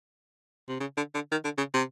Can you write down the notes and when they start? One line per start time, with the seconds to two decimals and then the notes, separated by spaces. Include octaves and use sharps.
0.69 C3
0.80 C#3
0.97 D3
1.15 D3
1.32 D#3
1.44 D3
1.58 C#3
1.74 C3